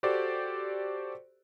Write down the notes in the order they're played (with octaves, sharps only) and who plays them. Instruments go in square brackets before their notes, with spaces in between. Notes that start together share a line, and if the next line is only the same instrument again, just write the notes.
[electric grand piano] F#4 G4 A4 C5 D5